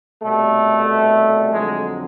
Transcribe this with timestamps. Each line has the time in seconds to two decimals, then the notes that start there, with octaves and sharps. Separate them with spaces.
0.23 C2 B2 G3 A3
1.52 F2 D3 F#3 G#3